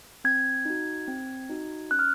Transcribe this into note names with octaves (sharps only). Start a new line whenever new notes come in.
C4 G#6
D#4 F#4
C4
D#4 F#4
C#4 F#6
F6